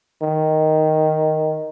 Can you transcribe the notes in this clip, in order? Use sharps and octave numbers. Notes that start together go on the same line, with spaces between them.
D#3